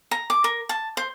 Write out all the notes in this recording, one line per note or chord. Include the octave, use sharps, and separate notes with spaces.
A#5
D6
A#4
A5
C5